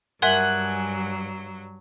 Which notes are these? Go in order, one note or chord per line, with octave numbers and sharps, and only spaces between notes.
G2 F#3 A#4 E5 F#5 G#5 C6